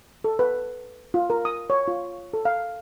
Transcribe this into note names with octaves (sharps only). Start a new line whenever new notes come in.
A4
B4
F4
A#4
D#6
C#5
F4
A4
F5